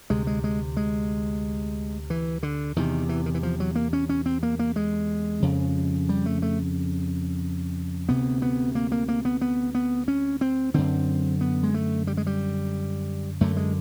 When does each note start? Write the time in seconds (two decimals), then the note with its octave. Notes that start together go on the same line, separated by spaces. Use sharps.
0.10 D2 C3 G#3
0.27 G#3
0.44 G#3
0.77 G#3
2.10 E3
2.43 D3
2.76 E2 C3 D#3
3.09 E3
3.26 D#3
3.34 E3
3.43 F3
3.60 F#3
3.75 A#3
3.93 C#4
4.09 C#4
4.26 C4
4.43 A#3
4.59 A#3
4.76 G#3
5.42 F2 C#3
6.09 G3
6.26 A3
6.42 A3
8.09 D2 C3 B3
8.42 B3
8.75 A#3
8.92 A#3
9.08 A#3
9.25 B3
9.41 B3
9.75 B3
10.08 C#4
10.41 C4
10.74 F#2 D3 C4
11.41 B3
11.63 G#3
11.74 A3
12.07 G3
12.17 G#3
12.27 G3
13.41 F#2 D3 A3
13.57 G#3